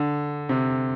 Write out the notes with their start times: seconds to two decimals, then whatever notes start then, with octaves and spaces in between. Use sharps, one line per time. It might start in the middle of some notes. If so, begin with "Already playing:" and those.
Already playing: D3
0.49 C3